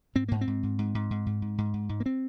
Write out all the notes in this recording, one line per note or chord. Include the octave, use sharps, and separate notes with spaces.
G#2 C4
G#2 A#3
C4
G#2
G#2
G#2
G#2
G#2
G#2
G#2
G#2
G#2
G#2
A#3
C4